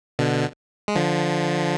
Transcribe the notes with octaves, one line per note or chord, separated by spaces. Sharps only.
B2 D3
G#3
D3 F3